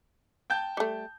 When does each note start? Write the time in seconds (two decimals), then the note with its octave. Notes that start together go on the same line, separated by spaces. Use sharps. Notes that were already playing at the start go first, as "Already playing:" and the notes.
0.50 G5 A5 G6
0.77 G3 A3